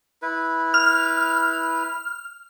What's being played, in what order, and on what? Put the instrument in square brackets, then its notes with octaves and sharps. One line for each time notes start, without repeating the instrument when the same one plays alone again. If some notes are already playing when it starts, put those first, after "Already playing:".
[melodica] E4 B4
[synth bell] F6